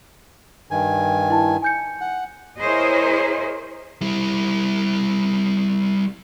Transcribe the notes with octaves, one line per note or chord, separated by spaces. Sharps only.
G2 D#3 G#5
E4 A5
G#5 G6 C#7
F#5
E4 G#4 A#4 C5 C#5 D#5
G3 E4